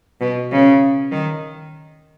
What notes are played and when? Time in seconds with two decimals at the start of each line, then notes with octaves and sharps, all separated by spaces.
0.20 B2
0.51 C#3
1.11 D#3